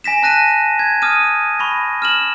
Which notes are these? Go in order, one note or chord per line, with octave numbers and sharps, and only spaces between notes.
G#5 A#6 B6 E7
A5 F#6 A#6 D#7
G#6
D#6 F6 D#7
B5 C#6 A#6
F6 E7 F#7